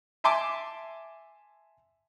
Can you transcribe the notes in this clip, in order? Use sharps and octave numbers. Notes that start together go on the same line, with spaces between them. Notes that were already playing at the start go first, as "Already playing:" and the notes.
E5 G#5 A5 C6 D6